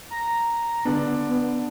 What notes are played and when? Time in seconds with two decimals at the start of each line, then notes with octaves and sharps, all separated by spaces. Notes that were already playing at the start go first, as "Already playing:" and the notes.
0.11 A#5
0.85 D3 B3 D4
1.29 B3